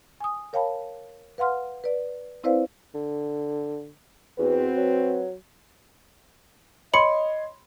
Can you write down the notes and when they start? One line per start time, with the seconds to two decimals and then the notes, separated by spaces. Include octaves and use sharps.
0.20 G#5 D#6
0.53 A#4 C#5 F5 G5 A5 B5
1.38 B4 F5 F#5 C6 F6
1.84 B4 D5
2.44 C4 E4 B4 C5 D5 F5
2.95 D3
4.39 E2 C4 F#4 B4
4.77 F#3
6.94 C#5 D#5 B5 C6 C#7